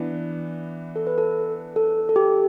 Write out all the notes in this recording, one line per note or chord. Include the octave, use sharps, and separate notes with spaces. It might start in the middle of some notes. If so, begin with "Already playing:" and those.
Already playing: E3 B3 D4
A4
B4
A4
A4
A4
G4